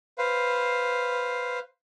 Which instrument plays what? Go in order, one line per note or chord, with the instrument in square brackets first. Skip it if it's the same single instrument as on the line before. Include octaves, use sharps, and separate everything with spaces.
[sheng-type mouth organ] B4 C5 F5